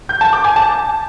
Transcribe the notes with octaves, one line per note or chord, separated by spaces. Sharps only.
G6
A5
D6
G#5
A5